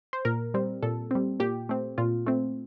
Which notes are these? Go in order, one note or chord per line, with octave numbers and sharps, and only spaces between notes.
C5
A#2 A#4
G3 C4
A#2 A4
G3 C4
A#2 G4
A3 C4
A#2 F4
A3 C4